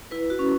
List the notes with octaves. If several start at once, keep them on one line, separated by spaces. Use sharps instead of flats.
E4 B4
F#4
C#4